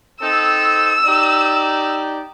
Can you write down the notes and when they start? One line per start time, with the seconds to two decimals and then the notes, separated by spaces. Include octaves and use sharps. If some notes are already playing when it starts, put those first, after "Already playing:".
0.22 C4 D#4 A4 E6
1.05 D#4 G4 D5